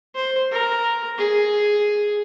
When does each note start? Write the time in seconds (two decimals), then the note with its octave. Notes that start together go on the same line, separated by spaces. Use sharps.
0.15 C5
0.52 A#4
1.18 G#4